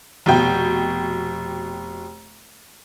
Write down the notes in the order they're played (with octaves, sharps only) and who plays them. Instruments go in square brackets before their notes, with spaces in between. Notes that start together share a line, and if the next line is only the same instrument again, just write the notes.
[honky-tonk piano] F1 B2 G5